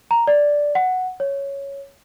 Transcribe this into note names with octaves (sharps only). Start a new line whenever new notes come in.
A#5
D5
F#5
C#5